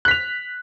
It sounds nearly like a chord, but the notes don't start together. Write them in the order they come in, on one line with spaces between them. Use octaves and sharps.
F#6 B6 F7